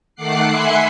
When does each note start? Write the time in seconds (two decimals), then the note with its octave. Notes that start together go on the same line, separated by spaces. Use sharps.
0.15 D#3 A3 F#5 D6 F#6 C7
0.50 E5 G#5 B5 C6 F#6 C#7